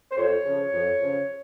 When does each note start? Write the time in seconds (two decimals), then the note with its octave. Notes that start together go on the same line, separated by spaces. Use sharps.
0.11 C5
0.16 F2 C#5
0.44 C#3 F3
0.72 F2
1.00 C#3 F3